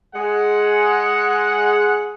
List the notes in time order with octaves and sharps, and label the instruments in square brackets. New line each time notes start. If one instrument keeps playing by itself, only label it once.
[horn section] G#3 F#5